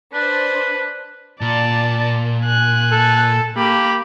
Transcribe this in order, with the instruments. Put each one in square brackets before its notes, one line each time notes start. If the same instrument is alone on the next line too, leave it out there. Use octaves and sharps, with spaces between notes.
[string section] D4 C5 [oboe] B4
[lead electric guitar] A#2 [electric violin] D5 A5
[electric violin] G#5 F#6
[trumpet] A4
[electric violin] A#3 B5 [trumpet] G4